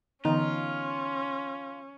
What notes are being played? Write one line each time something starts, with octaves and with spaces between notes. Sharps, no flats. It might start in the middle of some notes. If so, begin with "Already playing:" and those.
D3 E3 B3 C#4 D#4 F4